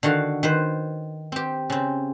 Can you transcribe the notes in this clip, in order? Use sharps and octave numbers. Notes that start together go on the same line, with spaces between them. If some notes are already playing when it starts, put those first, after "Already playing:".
D3 D#3 F#4 F5
D#3 B4 C5
C4 G4
C#3 C4